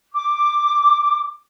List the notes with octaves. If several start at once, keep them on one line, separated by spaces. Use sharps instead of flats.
D6